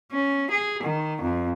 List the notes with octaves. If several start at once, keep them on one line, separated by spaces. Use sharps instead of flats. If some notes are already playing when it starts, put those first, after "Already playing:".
C#4
G#4
D#3
F2